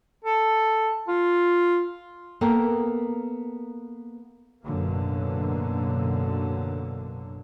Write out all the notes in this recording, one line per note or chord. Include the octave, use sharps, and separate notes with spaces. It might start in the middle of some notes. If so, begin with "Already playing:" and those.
A4
F4
A#3 B3 A4 A#4 G5
A1 F#2 B2 D3 F#3 A#3